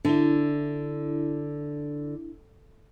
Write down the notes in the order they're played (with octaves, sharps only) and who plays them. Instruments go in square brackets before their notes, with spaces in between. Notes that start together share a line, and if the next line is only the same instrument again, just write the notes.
[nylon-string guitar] D3 [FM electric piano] D4 E4